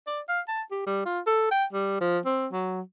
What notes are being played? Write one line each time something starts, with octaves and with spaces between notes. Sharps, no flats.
D5
F5
A5
G4
G3
F4
A4
G5
G3
F3
C4
F#3